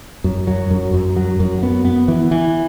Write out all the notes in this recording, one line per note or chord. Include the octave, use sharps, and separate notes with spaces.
F#2
F#3
F#2
F#2
F#3
F#2
B3
B3
E3
E3